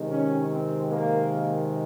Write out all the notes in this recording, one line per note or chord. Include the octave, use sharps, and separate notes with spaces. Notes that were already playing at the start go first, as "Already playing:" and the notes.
Already playing: C3 D#3 G#3
C#4
C4
A#3